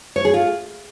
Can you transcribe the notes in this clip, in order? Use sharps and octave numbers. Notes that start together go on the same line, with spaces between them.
C#5
G#4
F4